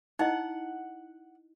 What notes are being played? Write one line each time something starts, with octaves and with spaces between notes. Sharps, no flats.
D#4 E4 D#5 F#5